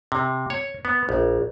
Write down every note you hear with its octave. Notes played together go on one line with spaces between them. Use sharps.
C3
C#5
B3
A#1